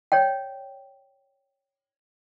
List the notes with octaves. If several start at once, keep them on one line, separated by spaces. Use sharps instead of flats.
C#5 D5 G5